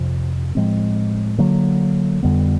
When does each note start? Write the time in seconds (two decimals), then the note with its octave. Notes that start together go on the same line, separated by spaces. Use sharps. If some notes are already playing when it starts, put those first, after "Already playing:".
Already playing: F2 C3 F3
0.55 A2 F3 G#3 C4
1.38 D3 F#3 A#3
2.23 F2 D3 G3 B3